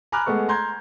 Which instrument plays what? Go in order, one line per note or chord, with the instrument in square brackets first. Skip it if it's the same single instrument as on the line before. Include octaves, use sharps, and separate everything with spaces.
[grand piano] G#5 A#5 B5 D6 F6 F#6
G#3 A3 B3 A4 C#6
A#5 C6 G6 G#6